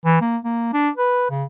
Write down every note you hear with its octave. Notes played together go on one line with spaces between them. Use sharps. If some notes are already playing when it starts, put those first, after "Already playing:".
E3
A#3
A#3
D4
B4
C#3